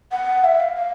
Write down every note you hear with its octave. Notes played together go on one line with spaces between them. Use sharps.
F#5
E5
F5
F5